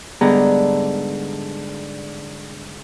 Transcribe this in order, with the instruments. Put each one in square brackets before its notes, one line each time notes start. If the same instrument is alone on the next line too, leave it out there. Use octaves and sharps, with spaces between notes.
[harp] G#2 D3 G3 B3 G#4 A#5